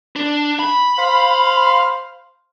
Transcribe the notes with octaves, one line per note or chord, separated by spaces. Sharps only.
D4
B5
C5 F5